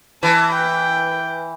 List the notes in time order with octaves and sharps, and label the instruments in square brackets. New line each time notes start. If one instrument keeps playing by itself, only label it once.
[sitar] E3 [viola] A5
[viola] G5